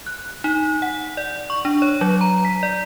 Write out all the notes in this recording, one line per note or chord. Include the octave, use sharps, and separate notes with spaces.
F#6
D#4
F#5
D5
C#6
D4
C#5
F#3
A#5
B6
D5